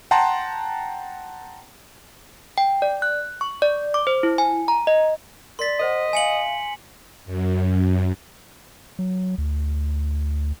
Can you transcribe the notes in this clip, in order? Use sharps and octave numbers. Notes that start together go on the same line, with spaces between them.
F#5 G5 A5 A#5 C6
G5
D5
F#6
C#6
D5
D6
C5
E4
G#5
A#5
D#5
A#4 D5 C6 A6 B6
A#4 C5 D#5 F#5
E5 F5 G#5 C#7 F#7
F#2
F#3
D2